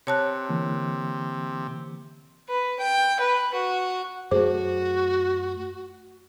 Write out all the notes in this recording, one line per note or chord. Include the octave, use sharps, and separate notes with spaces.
C3 C#5 A5 F#6
D3 E3 A#3
B4
G5
B4
F#4
F#2 A3 F#4 G#4 C5 D6